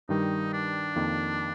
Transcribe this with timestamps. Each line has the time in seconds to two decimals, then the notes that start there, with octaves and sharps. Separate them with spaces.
0.09 G2 D#3 G3 D#4
0.53 D4
0.96 F2 D#3 A#3